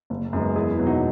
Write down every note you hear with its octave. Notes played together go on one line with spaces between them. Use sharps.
F#1
F#2 D#3 G#3 B3
E2 E4 G#4
E4
B2 F#3
D#4 F#4